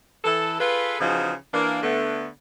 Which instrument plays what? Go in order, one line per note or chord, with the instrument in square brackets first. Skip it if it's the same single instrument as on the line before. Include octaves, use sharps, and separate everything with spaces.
[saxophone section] E3 A4
F4 G#4 A4 B4
C#3 E3 F3 D#4 F#4 G#4
E3 A#3 D4
D3 A3 B3